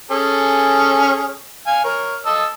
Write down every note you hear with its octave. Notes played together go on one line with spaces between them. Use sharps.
C#4 G#4 A4
F5 G#5
A#4 C#5
D#5 A5 E6